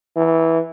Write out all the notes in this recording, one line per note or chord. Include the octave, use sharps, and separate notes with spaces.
E3